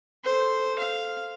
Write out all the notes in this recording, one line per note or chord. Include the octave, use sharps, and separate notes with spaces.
A4 C5
F5